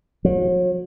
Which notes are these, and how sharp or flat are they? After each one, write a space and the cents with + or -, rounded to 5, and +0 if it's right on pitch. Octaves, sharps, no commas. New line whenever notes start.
F#3 -45